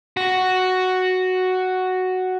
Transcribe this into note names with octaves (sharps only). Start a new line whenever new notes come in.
F#4